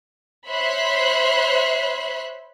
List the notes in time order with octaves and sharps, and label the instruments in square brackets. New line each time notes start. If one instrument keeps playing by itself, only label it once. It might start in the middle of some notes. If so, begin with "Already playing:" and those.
[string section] C5 C#5 E5 B5 C6 F#6